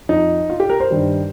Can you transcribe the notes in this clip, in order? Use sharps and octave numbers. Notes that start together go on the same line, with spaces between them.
F2 F3 D#4
F4
G4
A#4
C5
G2 D#3 G3